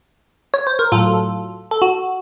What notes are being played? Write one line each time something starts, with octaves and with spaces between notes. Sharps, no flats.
C#5
C5
A#4
A2 F#3 F4 A4
A4
F#4